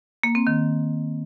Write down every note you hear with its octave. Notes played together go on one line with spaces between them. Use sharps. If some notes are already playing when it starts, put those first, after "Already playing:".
A#3
C4
D#3